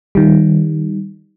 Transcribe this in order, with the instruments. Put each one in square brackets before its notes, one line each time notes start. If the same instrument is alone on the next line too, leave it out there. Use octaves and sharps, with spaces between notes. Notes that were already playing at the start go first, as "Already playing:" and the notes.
[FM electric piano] D#3 G3